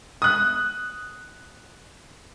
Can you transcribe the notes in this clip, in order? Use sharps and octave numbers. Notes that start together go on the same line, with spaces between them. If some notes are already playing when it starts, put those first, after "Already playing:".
D#6 F#6